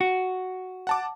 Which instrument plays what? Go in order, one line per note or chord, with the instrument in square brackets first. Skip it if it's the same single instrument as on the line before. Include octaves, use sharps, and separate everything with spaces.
[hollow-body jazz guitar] F#4
[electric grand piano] F#5 A5 D6